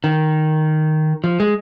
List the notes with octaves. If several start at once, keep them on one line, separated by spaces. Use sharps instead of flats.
D#3
F3
G#3